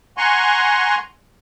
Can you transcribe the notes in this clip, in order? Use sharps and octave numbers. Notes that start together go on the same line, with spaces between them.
F#5 G#5 A#5 C6 C#6